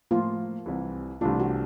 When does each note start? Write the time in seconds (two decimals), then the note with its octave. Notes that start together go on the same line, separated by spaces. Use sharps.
0.11 A2 F3 A#3 F4
0.66 C2 C3 E3
1.21 C2 C3 E3 A3 D4 F4
1.40 F#4